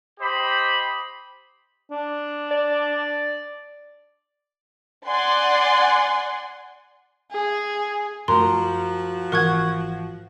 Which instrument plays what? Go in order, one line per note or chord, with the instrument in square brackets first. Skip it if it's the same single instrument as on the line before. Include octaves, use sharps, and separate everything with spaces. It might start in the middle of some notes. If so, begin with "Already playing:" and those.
[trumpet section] G4 C5 D#5 B5
[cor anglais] D4
[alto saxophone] D5
[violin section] D5 F#5 G#5 C6
[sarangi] G#4
[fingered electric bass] F#2 A3 [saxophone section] F3 F#4 [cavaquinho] A#4 [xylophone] C6
[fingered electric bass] G#1 E3 [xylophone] A#4 C#6 G#6 [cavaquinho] F#5